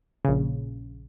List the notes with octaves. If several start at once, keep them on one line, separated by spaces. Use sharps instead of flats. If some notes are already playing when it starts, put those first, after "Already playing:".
A#1 C#3